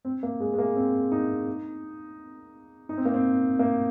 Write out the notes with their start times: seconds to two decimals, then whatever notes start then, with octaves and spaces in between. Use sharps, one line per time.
0.05 C4
0.23 A#3
0.40 G#3
0.54 G#3
0.58 A#3
0.76 C4
1.12 D#4
2.89 D#4
2.97 C4
3.05 A#3
3.14 C4
3.59 A#3